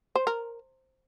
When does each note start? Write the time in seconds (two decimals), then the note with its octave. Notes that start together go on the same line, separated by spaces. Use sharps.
0.16 C5
0.27 A#4